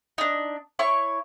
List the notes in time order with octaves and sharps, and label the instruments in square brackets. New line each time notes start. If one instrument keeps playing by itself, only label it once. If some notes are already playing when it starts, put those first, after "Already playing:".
[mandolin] D4 D#4
E4 C#5 C#6